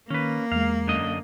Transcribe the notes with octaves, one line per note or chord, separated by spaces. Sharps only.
D#3 A#3 C#4 B4
E2 G#3 F5
F#2 D3 D#5